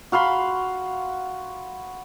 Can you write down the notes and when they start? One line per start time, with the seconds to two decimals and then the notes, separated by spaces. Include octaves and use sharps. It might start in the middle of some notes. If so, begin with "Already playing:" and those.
0.12 F#4 F5 B5 C6